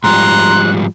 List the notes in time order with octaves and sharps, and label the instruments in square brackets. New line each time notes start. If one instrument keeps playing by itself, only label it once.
[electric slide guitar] G#2 F3 G3 [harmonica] A#5 C6 [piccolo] F#6